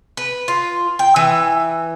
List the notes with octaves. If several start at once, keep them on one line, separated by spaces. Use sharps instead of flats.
B4
F4
G5
E3